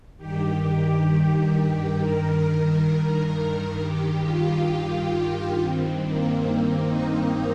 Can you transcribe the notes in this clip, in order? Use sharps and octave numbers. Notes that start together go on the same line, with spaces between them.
G2 D#3 G4
G2 D#3 A#4
G2 D#3 G4
F4
G2 D#3 C4
A#3
C4
D#4
C4